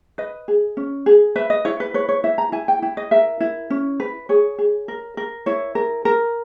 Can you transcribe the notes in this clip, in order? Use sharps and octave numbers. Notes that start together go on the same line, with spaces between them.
B4 D#5
G#4
C#4
G#4
B4 E5
D#5
E4 C#5
B4
B4 C#5
C#5
E4 E5
A#5
E4 G#5
G5
E4 G5
D#5
A#4 E5
E4
C#4
B4
G#4 C#5
G#4
A#4
A#4
E4 C#5
A#4
A#4